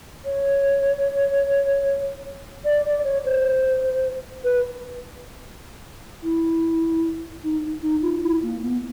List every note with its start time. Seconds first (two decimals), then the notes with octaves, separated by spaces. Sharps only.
0.25 C#5
2.64 D5
2.85 D5
3.04 C#5
3.25 C5
4.44 B4
6.23 E4
7.43 D#4
7.82 D#4
8.02 F4
8.22 E4
8.42 A#3
8.62 B3